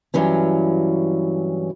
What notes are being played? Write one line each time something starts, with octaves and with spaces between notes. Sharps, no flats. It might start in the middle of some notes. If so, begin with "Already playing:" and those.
G2 E3 F#3 C#4